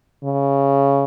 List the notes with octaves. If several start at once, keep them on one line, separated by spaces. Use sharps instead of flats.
C#3